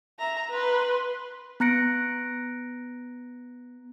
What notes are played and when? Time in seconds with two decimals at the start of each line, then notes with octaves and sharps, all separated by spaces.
0.19 E5 A#5
0.50 B4 C6
1.60 B3 A#5 F#6 A#6 C#7 D7